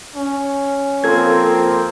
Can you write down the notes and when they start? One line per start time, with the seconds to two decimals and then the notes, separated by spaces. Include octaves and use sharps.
0.16 C#4
1.04 F3 A#3 C4 A4 G#6